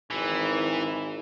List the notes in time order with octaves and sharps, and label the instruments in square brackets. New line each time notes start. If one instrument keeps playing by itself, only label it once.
[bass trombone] G#1 [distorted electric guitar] E3